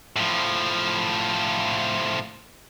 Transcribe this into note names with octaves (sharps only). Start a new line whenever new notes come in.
A2 F3